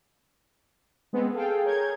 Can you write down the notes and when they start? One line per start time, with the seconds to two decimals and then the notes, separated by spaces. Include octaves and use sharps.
1.13 G#3 B3 C4
1.34 G#4 A4 F5 G5
1.64 G#4 A#4 C#5 G6 G#6